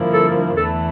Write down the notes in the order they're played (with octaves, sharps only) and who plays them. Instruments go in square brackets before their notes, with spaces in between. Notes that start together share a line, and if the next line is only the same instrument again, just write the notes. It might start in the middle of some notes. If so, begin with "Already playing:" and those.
Already playing: [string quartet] G2 D3 F3 A#3 E4
[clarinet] A4
[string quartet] E2 E3 A3 E4 [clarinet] A4